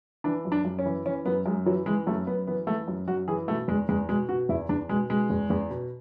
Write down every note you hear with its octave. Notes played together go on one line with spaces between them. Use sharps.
E3 D4
F#2
D4
F#2
C#4
E3
E3 C#4
F#2 B3
F#2 G#3
E3 F#3
E3 G#3
F#2 A3
F#2 B3
E3 B3
E3 A3
F#2
F#2 F#4
E3 G#4
B2 A3
E2 G#3
E2 G#3
B2 G#3
B2 F#4
E2 E4
E2 D4
B2 G#3
B2 G#3
E2
E2
B2